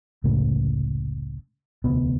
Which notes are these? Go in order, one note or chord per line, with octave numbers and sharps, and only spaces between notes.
F1 C#2 A2 C#3
E1 D2 C3 B3